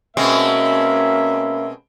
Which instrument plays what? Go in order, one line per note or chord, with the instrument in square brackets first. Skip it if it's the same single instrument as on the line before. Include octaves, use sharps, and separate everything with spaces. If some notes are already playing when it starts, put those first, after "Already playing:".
[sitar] B2 G#3 C4 [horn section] A#3 C#4 E5